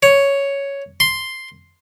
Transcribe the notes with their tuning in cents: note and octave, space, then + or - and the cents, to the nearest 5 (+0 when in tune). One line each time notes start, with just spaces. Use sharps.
C#5 +5
C6 +0